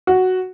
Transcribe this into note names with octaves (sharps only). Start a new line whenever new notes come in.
F#4